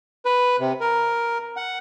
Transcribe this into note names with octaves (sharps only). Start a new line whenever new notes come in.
B4
C3
A#4
F#5